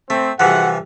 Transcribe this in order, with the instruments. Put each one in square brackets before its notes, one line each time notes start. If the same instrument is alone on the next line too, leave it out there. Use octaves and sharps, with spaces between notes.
[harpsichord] A3 [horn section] C4
[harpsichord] C2 E3 F3 [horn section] F#4 G#4 F#5